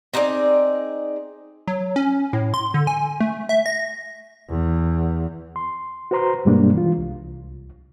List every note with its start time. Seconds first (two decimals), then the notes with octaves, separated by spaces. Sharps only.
0.14 C4 D#4 G#4 D5
1.68 F#3
1.96 C#4
2.33 A2
2.54 C6
2.74 D3
2.87 G#5
3.21 A3
3.49 E5
3.66 A#6
4.50 E2
5.56 C6
6.11 F#4 B4 C5 A#5 C6
6.45 G2 B2 G3 G#3 A#3 D4
6.73 E3 F4
6.98 C2